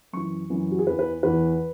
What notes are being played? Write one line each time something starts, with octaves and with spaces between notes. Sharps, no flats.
F#2 E3 C#6
F#2 E3
F#4
G#4
E2 E3 B4
B4
E2 E3 B4